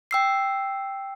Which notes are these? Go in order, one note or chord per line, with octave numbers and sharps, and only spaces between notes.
G5 E6 C7